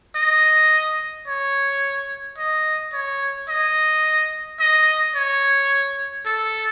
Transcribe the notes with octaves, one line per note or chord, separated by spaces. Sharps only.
D#5
C#5
D#5
C#5
D#5
D#5
C#5
A4